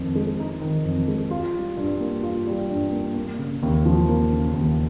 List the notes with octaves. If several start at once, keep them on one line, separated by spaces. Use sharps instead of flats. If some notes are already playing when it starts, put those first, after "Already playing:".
Already playing: F2 D#3
G#3
D#4
D#3
F2
G#3
F4
G3
G2
A#3
F4
G3
G2
A#3
A#3
C#3
D#2
F3
A#3
C#3
D#2